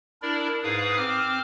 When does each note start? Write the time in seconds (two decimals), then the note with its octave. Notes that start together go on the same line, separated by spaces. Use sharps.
0.22 D4 E4 A#4 D5
0.63 G#2 G#4 B4 F5 D#6
0.97 C4 D6 F6